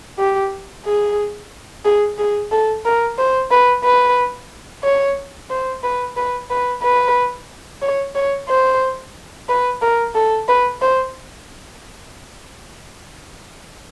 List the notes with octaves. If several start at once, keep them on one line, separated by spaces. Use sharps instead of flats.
G4
G#4
G#4
G#4
A4
A#4
C5
B4
B4
C#5
C5
B4
B4
B4
B4
C#5
C#5
C5
B4
A#4
A4
B4
C5